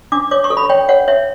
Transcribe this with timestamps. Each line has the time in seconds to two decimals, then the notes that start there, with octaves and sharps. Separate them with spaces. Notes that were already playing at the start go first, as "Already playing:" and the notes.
0.12 D4 D6
0.31 C#5 D6
0.44 C#6
0.50 A4
0.57 B5
0.70 C#5 G5
0.89 C#5 F#5
1.08 C#5 E5